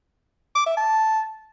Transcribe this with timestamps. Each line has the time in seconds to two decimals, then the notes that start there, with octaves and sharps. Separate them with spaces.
0.55 D6
0.66 E5
0.77 A5